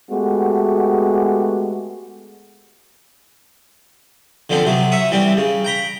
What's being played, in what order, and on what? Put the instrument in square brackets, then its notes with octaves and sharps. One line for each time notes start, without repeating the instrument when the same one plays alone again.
[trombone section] G#3 A3 B3 F#4 G4
[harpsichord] D3 F3 B3 C4 D4
C3 F#3 B3
E5 C#6 D#6
E3 G3 C4
C#3
G5 A#5 B5